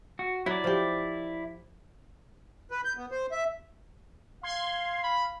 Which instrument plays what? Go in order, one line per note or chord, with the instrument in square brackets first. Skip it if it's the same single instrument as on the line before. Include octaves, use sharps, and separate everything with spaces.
[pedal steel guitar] F#4
[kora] F#3 [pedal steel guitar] E4 D5
[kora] F3 G4
[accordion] B4
G6
B3
C5
E5
[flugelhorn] F5 [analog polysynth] C6 G#6
[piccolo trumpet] B5